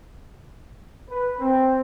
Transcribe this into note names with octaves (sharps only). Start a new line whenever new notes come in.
B4
C4